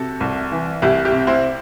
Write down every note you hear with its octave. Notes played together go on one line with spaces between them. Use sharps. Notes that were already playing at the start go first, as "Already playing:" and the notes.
Already playing: C3 F#4 A4
C2
E3
C2 E4 G4
E4 G4
C3
C4 E4